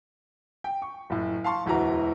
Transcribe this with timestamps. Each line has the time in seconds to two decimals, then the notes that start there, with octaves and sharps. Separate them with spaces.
0.64 G5
0.82 C#6
1.10 F#1 A2
1.44 F5 A5 C6 C#6
1.65 E1 D2 E3 F#4 A#5